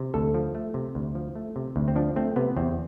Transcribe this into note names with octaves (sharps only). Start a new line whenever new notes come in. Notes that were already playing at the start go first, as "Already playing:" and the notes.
Already playing: C3
D2 A4
F3
A3
C3
D2
F3
A3
C3
D2
C4
F3 D4
A3 C4
C3 B3
E2 C4